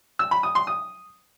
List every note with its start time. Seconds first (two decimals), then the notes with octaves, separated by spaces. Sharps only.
0.19 E6
0.31 B5
0.43 D#6
0.55 C6
0.67 D#6